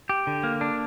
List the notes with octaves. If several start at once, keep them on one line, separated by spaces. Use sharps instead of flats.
G4
D3
A#3
D4